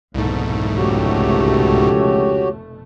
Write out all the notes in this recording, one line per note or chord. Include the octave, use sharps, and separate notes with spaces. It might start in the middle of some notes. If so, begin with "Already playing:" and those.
F1 C2 G#2 B2 A3
C#2 F#4 G4 C#5